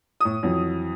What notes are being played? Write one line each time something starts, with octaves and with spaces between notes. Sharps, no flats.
A2 D#6
F2 E3 F#3